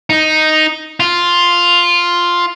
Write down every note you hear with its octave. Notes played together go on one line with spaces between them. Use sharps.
D#4
F4